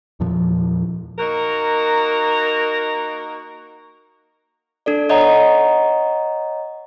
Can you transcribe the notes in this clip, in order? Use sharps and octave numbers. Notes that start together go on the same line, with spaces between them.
E2 A#2 F3
A#3 D#4 F#4 A#4
D4 A4 D5
C#5 D#5 F#5 A#5